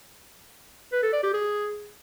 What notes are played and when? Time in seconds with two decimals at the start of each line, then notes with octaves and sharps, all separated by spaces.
0.92 B4
1.03 A4
1.13 D5
1.23 G4
1.34 G#4